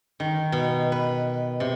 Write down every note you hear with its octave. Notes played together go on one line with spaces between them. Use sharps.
D#3
B2
B4
C3